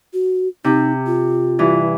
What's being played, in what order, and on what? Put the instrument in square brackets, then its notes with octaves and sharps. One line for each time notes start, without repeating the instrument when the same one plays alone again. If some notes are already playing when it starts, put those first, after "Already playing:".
[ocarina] F#4
[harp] C3 [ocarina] D#4
[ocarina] F4
[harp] G2 E3